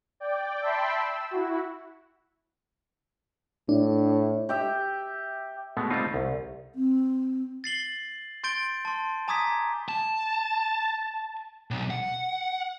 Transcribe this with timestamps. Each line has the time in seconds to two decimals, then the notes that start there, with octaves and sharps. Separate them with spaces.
0.20 D5 G5
0.61 E5 G5 A5 B5 C6
0.96 E6
1.31 E4 F#4
3.69 A2 D4
4.49 G4 E5
5.77 B2 G#3 A3 B3
5.90 G3 A3 C4 D#4 F4
6.14 C2
6.75 C4
7.64 A6 C7 F#7 G7
8.44 C6 G6 A6 D7 G7
8.85 A5 C6
9.28 G#5 A#5 D6 D#6 G#6 B6
9.89 A5
11.71 B1
11.90 F#5